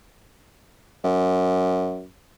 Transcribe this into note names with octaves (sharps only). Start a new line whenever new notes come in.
F#2